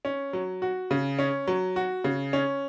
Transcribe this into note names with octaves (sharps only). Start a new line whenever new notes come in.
C#4
F#3
F#4
C#3
C#4
F#3
F#4
C#3
C#4